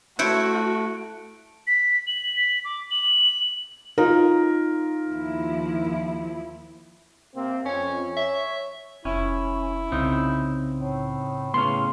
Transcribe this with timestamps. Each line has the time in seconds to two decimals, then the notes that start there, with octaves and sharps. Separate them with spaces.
0.19 A3 E4 F#4 C5 C#5 F#6 C#7 D7
1.67 B6
2.07 F#7
2.36 B6
2.65 D6
2.91 F#7
3.98 D#4 F4 A#4
5.09 D#2 F3 E4
7.35 C3 A#3 C4
7.66 F2 C#4
8.17 C#5 E5
9.05 F1 C#4 E4
9.92 C2 C#3 C4 D#4
10.77 A2
11.54 A2 C#3 B3 C#4 C6